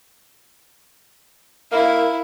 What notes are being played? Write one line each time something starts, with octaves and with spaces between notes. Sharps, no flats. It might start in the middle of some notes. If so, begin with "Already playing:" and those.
A#3 E4